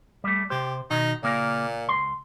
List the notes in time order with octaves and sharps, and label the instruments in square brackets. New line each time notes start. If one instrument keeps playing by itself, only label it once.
[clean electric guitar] G3 A3
[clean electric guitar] C3 C5 [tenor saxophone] G4
[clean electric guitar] B2 D#3 [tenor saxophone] D#4
[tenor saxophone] A#2 [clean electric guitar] C#3 A#3 A#4
[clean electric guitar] C#2 C6